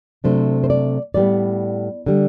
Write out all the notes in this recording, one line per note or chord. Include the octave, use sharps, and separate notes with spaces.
C3 F#3 A3 D4 C5
C5
D5
A2 G3 B3 D5
D3 G3